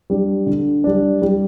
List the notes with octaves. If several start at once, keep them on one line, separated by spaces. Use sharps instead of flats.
G3 D4
D3
G3 D4
G3